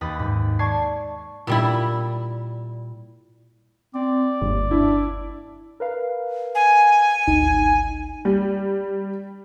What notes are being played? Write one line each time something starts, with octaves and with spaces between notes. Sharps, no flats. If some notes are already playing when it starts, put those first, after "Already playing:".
D#2 B4 B5 D#6 A6
G#2
D5 A5 C#6 G#6 C7
A#2 G3 E4
C4 D5
G1 D#2
D4 E4
A#4 B4 F5
G#5
G#1 D2 D#4
G3